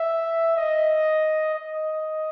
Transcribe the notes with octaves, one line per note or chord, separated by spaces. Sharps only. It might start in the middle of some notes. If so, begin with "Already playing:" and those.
Already playing: E5
D#5
D#5